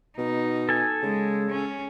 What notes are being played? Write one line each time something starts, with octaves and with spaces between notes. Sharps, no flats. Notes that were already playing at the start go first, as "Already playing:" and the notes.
B2 D#4
A4 G#5
C#3 G#3
C#4